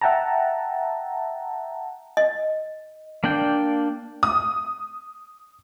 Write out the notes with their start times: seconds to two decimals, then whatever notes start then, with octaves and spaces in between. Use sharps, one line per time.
0.01 E5 F#5 G5 A5 A#5
2.17 D#5
3.24 A#3 D4 D5 G5
4.23 D#6